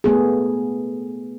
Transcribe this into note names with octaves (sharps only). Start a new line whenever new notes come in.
A3 B3 G#4